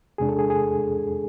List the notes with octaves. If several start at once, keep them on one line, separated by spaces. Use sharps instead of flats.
E2 C3 G#3 D4 G#4
A4
G#4
G#4